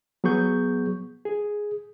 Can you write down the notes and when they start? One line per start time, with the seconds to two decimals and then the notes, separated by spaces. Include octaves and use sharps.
0.24 F#3 B3 G#4 C#6 G6
1.25 G#4